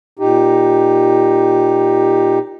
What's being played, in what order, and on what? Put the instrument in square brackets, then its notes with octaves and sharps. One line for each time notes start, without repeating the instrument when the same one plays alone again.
[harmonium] A#2 D#4 G4